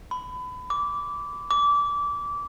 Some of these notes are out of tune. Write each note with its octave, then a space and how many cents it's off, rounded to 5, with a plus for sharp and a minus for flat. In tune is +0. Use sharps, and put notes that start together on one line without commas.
B5 +25
D6 -20
D6 -25